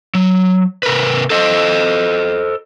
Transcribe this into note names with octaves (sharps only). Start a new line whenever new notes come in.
F#3
C3 A#4 B4
A4 C5 D#5